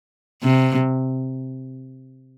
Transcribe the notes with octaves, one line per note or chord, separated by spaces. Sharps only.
C3